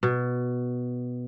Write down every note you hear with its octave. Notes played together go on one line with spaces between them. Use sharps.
B2